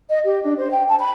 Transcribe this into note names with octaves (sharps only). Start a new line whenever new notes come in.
D#5
G4
D4
C5
G5
A5
B5